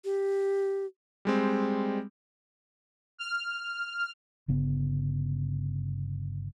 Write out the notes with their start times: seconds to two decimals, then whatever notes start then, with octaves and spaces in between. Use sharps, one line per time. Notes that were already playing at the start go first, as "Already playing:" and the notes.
0.05 G4
1.25 G3 G#3 C4
3.18 F6
4.48 G1 C#3 B3